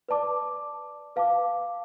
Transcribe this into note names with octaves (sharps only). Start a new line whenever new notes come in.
B4 D5 A5 D6
B4 F5 A5 D6